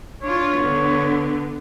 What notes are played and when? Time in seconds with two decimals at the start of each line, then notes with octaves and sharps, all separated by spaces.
0.22 D4 F4 C#5
0.57 D3 B3